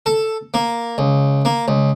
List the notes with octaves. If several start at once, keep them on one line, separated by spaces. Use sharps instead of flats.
A4
A#3
C#2
A#3
C#2